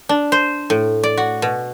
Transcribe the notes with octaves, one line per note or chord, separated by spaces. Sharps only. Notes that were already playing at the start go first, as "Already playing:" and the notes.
D4
C5
A2
D5
F#4
B2